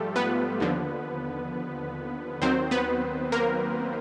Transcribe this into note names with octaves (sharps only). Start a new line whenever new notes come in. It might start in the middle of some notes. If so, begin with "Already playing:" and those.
Already playing: G#2 F3 G3 A3 F4 G4 A4
B3 B4
D#2 D3 F3
D#2 D#3 F#3 C4 C5
B3 B4
A#3 A#4